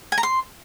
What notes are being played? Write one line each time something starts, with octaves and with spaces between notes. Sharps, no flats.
G#5
A#5
C6